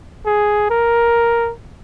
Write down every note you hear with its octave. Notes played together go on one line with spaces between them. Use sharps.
G#4
A#4